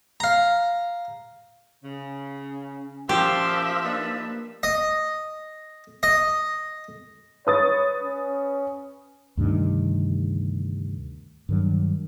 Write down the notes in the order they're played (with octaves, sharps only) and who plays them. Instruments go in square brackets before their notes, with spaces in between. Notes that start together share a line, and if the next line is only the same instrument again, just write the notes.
[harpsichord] F5 A#5
[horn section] C#3 [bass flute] C#4
[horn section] A#2 A5 C6 [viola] F3 E5 [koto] G4
[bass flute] A#3 [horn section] D4 D#4 B4
[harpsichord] D#5
D#5
[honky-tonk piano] B4 D#6 A6 [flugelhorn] C#5
[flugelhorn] C#4
[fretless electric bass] D2 G2 C3 D#3
G2 D#3 F#3